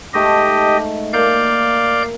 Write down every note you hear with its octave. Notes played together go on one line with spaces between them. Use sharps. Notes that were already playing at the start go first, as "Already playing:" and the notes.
G#2 A3 G4 A4 D#5
A#3 D5 F5 G6